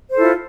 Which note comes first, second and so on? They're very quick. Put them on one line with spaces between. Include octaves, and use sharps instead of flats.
C5 A4 E4 F4